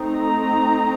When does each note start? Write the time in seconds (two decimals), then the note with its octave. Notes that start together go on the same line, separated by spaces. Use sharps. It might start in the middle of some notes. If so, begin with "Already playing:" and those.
Already playing: A3 C4 D#4
0.08 A#5